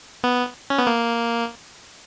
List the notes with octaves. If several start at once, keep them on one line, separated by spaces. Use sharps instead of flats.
B3
C#4
B3
A#3